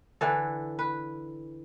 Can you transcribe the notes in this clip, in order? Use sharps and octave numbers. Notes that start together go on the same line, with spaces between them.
D3 E3 A4
B4